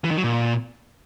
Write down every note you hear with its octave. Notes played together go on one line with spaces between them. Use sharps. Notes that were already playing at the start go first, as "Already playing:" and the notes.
E3
D#3
F#3
A#2